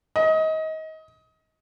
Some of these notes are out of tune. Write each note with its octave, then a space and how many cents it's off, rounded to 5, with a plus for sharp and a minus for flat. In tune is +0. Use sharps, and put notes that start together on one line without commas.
D#5 +25